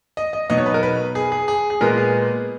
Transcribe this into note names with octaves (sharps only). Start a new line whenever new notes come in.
D#5
D#5
B2 F#3 B3 D#4 D#5
C#5
B4
A#4
B4
G#4
G#4
G#4
G#4
A#2 G#3 B3 A#4
G#4